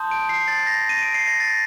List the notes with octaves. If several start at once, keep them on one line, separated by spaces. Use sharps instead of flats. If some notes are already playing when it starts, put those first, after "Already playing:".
Already playing: A5 C6 D#6 G6
D7
C7
A6
A#6
D#7
D7
C7
A#6
A6